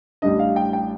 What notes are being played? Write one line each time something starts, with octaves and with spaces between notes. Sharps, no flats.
A1 A2 G3 D4 D#5
F5
G5
G5